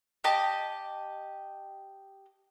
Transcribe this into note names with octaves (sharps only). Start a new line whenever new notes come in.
G4 D#5 A5